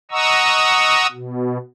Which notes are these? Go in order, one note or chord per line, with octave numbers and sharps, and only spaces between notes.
D#5 F#5 A#5 C#6 D#6 E6
B2